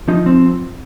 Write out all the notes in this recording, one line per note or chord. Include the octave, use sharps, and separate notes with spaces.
F3 D#4
C4